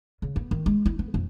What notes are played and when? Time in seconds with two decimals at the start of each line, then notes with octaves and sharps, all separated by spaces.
0.22 C#3
0.36 B3
0.51 D#3
0.66 G#3
0.86 E4
0.99 B3
1.14 F2